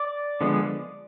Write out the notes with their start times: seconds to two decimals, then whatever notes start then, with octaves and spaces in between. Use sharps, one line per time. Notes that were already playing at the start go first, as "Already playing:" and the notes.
Already playing: D5
0.41 D3 F3 G#3 B3